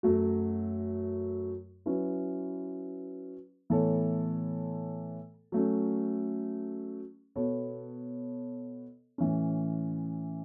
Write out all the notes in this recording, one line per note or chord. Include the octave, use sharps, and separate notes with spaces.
F#2 F#3 A3 F#4
F#3 C#4 E4 B4
A2 E3 B3 A4 C#5
F#3 A3 C#4
B2 B3 A4 C#5
A2 E3 C#4